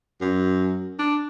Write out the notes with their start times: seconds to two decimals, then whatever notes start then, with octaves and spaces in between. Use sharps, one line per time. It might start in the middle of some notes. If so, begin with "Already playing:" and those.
0.21 F#2
0.99 D4